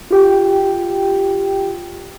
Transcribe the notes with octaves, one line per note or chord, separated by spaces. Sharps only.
F4 G4 G5